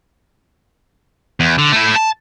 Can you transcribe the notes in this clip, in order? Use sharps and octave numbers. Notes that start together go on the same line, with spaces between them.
E2
D3
A3 E4
A5